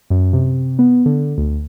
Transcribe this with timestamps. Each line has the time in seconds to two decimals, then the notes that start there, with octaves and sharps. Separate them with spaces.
0.10 F#2
0.33 C3
0.79 B3
1.06 D3
1.38 D2